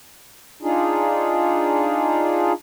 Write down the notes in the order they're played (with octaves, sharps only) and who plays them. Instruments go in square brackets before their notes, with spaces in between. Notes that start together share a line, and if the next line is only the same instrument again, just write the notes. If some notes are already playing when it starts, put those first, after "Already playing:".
[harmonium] D4 D#4 F4 G#4